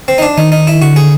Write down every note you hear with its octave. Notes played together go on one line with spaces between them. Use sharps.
C4
D#4
D4
D#3 D#4
D#4
E4
D3 F#4
G#4